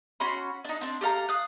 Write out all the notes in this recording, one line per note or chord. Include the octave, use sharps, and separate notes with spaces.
C#4 F#4 B5 C6
D4 D#4
C4 D4
G4 A4 F5 A#5
F5 D#6 F#6